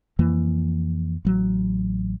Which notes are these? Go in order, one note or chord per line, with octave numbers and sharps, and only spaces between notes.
F2 E3 A#3
A1 F#3